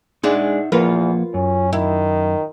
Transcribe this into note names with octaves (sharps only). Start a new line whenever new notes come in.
G#3 D4 D#4 E5 F#5
E2 F3 A#3 F4 A#4 B4 F#5
F#2 C#4
D#3 E4